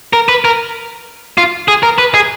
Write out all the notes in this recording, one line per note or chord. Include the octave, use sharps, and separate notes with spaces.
A#4
B4
A#4
F4
G#4
A#4
B4
G#4